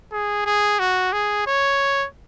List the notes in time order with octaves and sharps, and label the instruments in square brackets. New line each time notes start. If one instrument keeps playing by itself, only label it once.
[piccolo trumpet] G#4
G#4
F#4
G#4
C#5